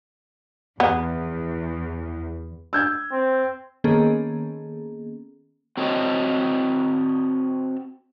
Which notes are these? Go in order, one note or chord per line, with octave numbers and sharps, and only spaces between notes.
E2 B3
E6 G6 G#6
C4
D#3 A#3 B3 C#4 G#4 A4
C4 F#4 A4 C#5 D#5